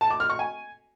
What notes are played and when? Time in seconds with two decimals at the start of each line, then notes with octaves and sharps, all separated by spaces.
0.01 A5
0.11 D6
0.20 F6
0.30 C#6
0.39 G#5